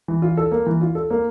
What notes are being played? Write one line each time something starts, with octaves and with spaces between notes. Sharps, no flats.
E3
F4
A4
A#3
E3
F4
A4
A#3